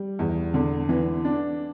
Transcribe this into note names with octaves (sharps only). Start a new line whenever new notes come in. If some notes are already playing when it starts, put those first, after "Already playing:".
Already playing: G3
E2
D3
E3
D4